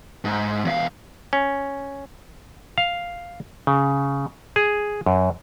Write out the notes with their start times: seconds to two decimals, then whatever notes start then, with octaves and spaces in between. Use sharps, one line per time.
0.25 G#2
0.65 E2 F5
1.33 C#4
2.78 F5
3.67 C#3
4.56 G#4
5.06 F#2